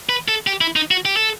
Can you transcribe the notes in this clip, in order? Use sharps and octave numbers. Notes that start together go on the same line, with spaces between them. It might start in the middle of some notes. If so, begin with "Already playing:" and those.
B4
A4
G4
E4
D#4
F#4
G4
A4